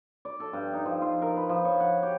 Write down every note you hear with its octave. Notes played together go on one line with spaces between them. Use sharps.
D5
A4
G2
D#4
F3
F4
A#4
B4
F3
C#5
F#5
G4